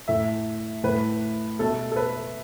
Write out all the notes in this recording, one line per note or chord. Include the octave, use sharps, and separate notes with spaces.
A2 A3 E5
A2 A3 B4
B2 A3 A4
A4
B4